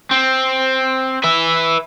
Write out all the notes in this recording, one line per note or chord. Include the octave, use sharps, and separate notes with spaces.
C4
B4 E5